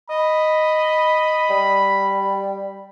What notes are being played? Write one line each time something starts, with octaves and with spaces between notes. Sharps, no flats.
D#5 B5
G3